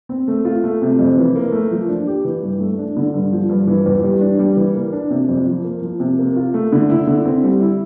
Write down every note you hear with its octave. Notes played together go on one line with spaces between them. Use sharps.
C4
A3
F4
A3
C3
F2
E3
A#3
A3
F3
D4
G4
E3
G2
A3
D4
D3
G2
F3
G2
E3
E2
G3
D4
G3
E3
A#3
D4
C3
F2
F3
A#3
F3
C3
A#3
F4
A3
D3
E4
D3
C4
G3
E4